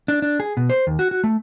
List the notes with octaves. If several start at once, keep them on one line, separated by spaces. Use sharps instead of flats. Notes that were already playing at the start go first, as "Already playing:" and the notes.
D4
D4
G#4
B2
C5
D#2
F#4
F#4
A3